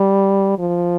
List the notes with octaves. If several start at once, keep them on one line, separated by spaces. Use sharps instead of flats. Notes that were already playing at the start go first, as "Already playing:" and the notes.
Already playing: G3
F3